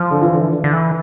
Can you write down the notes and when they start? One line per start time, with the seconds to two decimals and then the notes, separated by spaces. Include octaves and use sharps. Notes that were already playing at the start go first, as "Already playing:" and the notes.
Already playing: F3
0.11 D3
0.22 E3
0.33 D3
0.41 E3
0.52 D3
0.64 D3
0.73 E3